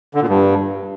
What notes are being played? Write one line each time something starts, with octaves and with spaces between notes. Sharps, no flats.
D3
A#2
G2